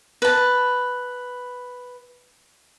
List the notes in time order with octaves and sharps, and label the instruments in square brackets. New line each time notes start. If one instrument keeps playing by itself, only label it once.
[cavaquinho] B4 A5